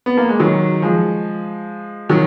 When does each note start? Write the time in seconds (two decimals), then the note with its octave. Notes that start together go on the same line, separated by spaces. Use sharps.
0.06 B3
0.18 A#3
0.29 G#3
0.40 D#3 F#3
0.82 F3 G#3
2.10 D#3 F#3